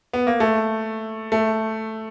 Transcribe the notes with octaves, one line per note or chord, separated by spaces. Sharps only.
B3
A#3
A3
A3